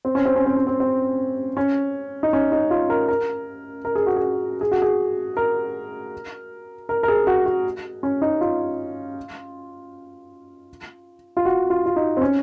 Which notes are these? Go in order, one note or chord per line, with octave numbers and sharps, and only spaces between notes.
C4
C#4
C4
C#4
C4
C#4
C4
C4
C#4
D#4
C#4
D#4
F4
A#4
A#4
A#4
G#4
F#4
G#4
G#4
F#4
G#4
A#4
A#4
A#4
G#4
F#4
F#4
C#4
D#4
F4
F4
F#4
F4
F4
D#4
C4
C#4